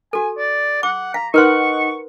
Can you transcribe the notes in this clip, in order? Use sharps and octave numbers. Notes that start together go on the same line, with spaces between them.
F#4 A4 G#5
D5
F#5 D6
F5 A#5
D#4 A#4 B4 F#5 C6 C#6